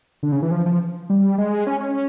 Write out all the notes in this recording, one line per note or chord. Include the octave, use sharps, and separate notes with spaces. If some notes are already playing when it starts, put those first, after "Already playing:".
D3
C#3
E3
F3
F3
G3
G#3
C#4
C#4